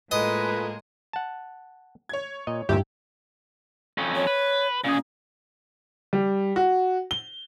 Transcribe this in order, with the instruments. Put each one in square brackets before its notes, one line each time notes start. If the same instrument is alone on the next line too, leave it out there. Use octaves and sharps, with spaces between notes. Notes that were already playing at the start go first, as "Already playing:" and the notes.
[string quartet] A2 G#3 A#3 [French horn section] F4 A4 [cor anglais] B4 [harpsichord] D#5
[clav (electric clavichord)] F#5 A5
[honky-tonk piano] C#5 G#6
[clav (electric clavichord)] A#2 D#5
[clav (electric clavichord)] D2 A#2 E5 [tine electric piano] G2 [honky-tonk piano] E4 [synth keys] G4
[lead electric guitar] F2 C#4
[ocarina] C#5
[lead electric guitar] B4
[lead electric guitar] A#2 G#4 [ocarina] C#4
[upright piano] G3
F#4
G7